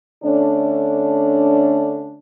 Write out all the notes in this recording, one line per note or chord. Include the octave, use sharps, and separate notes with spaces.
D3 A3 C#4 D4